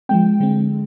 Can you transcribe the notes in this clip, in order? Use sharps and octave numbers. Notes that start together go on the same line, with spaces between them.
F3 G#3 C4 G5
D3 G#3 C4